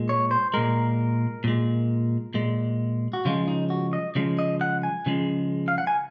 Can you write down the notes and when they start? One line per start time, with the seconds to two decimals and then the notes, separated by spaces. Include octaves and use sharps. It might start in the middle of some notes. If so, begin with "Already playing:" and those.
Already playing: A#2 G#3
0.09 C#5
0.31 C5
0.54 A#2 G#3 A#4
1.44 A#2 G#3
2.34 A#2 G#3
3.13 F#4
3.25 C#3 F3 G#3 F4
3.48 D#4
3.70 F#4
3.93 D#5
4.15 C#3 F3 G#3
4.39 D#5
4.61 F#5
4.83 G#5
5.06 C#3 F3 G#3
5.68 F5
5.78 F#5
5.87 G#5